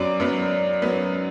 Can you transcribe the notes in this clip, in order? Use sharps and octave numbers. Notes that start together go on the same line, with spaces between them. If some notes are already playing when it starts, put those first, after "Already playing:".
Already playing: F#2 F#3 B3 D5
F#2 F#3 B3
F#3 B3